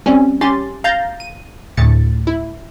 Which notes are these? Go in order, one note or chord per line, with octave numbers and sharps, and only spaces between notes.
G3 C4 C#4
C#4 G4 C6 A6
F5 A#5 G6 A6
D#7
D2 A2 A6 C#7
E4